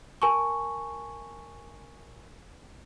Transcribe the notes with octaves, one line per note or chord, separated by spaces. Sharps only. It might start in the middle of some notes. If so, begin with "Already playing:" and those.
A#4 G#5 A5 C#6